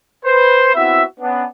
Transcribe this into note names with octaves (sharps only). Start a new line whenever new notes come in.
B4 C5
B3 C4 E4 F#4 E5
B3 C#4 D4